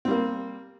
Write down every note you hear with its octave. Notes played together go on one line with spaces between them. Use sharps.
G3 A#3 C4